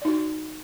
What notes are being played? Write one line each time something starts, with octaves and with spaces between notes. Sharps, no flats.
D#4 F#4 D5